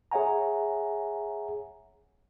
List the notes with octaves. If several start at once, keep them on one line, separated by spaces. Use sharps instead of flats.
G#4 C#5 E5 F#5 G#5 A#5